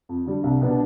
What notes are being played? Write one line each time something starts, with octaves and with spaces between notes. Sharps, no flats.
F2
D3 G3
C2
B2 B3 D4